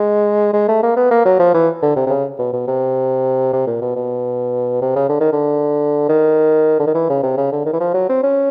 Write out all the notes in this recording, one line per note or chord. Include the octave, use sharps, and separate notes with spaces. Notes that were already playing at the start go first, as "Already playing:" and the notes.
Already playing: G#3
G#3
A3
A#3
B3
A#3
F#3
F3
E3
D3
C3
C3
C#3
B2
B2
C3
C3
A#2
B2
B2
C3
C#3
D3
D#3
D3
D#3
D3
D#3
E3
C#3
C3
C#3
D3
D#3
E3
F3
F#3
C4
C#4